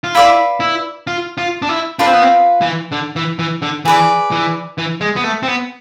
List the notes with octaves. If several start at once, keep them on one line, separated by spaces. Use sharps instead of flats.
F4
E4 B4 D5 F5 B5
E4
F4
F4
D4
E4
D4 F4 B4 F5
C4
B3
C4
E3
D3
E3
E3
D3
E3 G#4 B4 D5
E3
E3
G#3
B3
A3
C4
B3